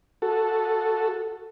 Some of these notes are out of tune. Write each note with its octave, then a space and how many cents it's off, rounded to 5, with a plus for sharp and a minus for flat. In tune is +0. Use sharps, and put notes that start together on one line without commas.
F#4 -5 A4 +0